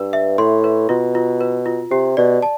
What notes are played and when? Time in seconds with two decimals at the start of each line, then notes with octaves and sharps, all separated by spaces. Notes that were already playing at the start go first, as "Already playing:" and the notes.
Already playing: G2 B4
0.13 E5
0.38 A2 C6
0.64 B4
0.89 B2 F4
1.15 F4
1.41 B4
1.66 F4
1.91 C3 G4
2.17 B2 D5
2.42 A5